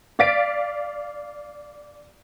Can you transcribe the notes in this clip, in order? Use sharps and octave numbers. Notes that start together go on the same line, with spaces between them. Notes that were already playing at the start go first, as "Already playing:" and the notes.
D5 F5 A6 B6 D7